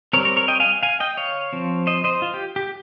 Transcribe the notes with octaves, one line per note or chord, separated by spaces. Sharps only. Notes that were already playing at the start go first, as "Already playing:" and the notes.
G3 C4 A#4 C#5
A#4 C#5
A#4 C#5
D#5 G5
F5 G#5
F5 G#5
D#5 G5
C#5 F5
F3 C4
C5 D#5
C5 D#5
F4
G4
G4